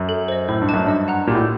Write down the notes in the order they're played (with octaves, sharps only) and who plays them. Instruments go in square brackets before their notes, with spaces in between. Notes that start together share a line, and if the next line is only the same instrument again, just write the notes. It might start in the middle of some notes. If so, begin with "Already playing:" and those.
Already playing: [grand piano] F#2
[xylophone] A4
C5 D#5
[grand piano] A2 [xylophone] C5
[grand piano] G2
[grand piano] F#2 [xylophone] D#5 A5 D6 F#6
[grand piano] G2 [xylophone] D#5
[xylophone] F#5 A#5 F#6
[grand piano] A#2 [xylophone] G4
[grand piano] A2